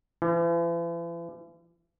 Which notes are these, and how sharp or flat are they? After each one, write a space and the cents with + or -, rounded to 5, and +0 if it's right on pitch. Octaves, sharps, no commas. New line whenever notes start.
E3 +40